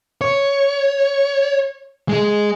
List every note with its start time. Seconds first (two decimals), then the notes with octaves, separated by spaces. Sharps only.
0.21 C#5
2.09 G#3 G#4